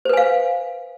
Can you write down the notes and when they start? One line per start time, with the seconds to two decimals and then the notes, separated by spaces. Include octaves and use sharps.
0.05 C5
0.09 B4
0.13 G#5
0.17 F5